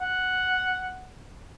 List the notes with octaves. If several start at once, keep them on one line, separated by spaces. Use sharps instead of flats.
F#5